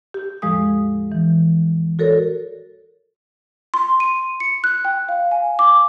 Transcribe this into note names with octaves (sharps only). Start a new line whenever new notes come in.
G4
E2 A2 F3 G#3 G4 D#6
E3
F#4 A4 A#4 C#5 D5
C6
D#7
C#7
F#6
G5
F5
G#5
D6